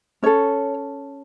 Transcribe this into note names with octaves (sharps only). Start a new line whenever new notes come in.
C#4 A4 C#5